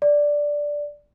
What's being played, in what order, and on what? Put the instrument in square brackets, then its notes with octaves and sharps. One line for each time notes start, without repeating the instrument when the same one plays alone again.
[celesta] D5